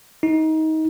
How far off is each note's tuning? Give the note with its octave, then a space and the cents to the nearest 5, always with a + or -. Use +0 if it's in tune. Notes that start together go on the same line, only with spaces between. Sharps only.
D#4 +25